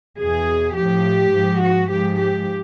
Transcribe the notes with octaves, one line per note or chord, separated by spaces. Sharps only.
E2 B2 G#4
A2 F3 G4
G#2 F3
F#4
G#2 F3 G4
G4